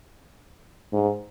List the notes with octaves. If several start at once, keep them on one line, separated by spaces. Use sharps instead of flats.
G#2